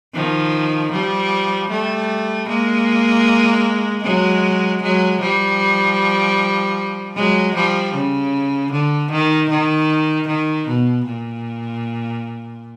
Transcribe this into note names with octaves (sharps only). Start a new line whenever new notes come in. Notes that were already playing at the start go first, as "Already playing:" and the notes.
D#3 F3
F3 G3
G3 A3
G#3 A#3
F#3 G#3
F#3 G#3
F3 G3
F#3 G#3
F3 G3
C#3
D3
D#3
D#3
D#3
B2
A#2